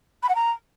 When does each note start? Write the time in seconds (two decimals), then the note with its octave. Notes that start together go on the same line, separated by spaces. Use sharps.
0.22 B5
0.29 F#5
0.35 A#5